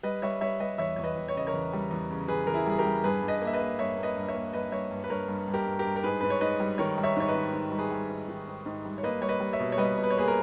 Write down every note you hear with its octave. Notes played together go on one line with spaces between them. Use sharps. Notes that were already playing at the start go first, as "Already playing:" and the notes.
G3 B4 D#5
G3 C#5 E5
G3 C#5 E5
G3 B4 D#5
E2 C#5 E5
E2 C#5
B4 D#5
E2
C#5
C#3 D#5
A#4 C#5
E2
G3
E2
C#3
E2 G#4 B4
E2 A#4
E4 G#4
G3 G#4
G4 A#4
G3
G2 G#4 B4
G2
B4 D#5
A#3
E5
B4 D#5
A#3
G2 C#5 E5
A#3
B4 D#5
G2
C#5 E5
A#3
G2 B4 D#5
G2 C#5 E5
G2
B4
G2 A#4 C#5
G2
G2
G4 A#4
G2
G4 A#4
G2
A#4
G#2 G#4 B4
G#2 B4
C#5
G#2 B4 D#5
G3
D#3 A#4 C#5
G3
C#5 E5
G#2 C#5
B4 D#5
D#3
G#2
G3
G#4 B4
G3
G#2
D#3
G#2
G#2
G3
C#5
A#3 B4 D#5
G3 C#5
B4 D#5
G3
C#5 E5
B2
C#5
G3 B4 D#5
B2
B4
C#5
A#3 G#4 B4
A#4